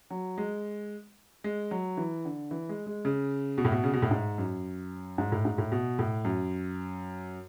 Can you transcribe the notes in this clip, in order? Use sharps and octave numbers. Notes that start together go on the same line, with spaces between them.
F#3
G#3
G#3
F#3
E3
D3
E3
G#3
G#3
C#3
B2
A2
B2
C#3
B2
A2
G#2
F#2
G#2
A2
G#2
A2
B2
A2
F#2